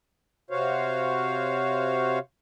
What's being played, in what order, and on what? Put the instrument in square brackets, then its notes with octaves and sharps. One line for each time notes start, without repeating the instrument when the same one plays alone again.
[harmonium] C3 F#4 C5 C#5 F5